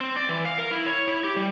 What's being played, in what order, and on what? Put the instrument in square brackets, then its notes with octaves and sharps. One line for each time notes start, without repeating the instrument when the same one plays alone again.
[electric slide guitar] C4
D5
E3
F5
A#4
E4
C#5
E4
G4
G3